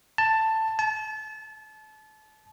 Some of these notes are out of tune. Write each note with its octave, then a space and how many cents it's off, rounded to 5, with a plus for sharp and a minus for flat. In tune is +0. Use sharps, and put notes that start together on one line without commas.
A5 +10
A5 -30